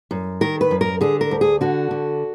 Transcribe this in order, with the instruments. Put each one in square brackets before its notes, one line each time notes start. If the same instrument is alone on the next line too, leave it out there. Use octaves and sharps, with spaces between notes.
[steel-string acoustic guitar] F#2
D#3 A#4
B4
F#2
A#4
D3 G#4
A#4
D2
G#4
D3 F#4
D3